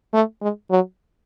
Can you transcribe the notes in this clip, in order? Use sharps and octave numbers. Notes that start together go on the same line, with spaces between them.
A3
G#3
F#3